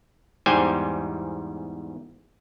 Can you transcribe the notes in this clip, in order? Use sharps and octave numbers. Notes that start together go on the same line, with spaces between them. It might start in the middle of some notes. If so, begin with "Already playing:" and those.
E2 G#2 G3 C5 G5 G#5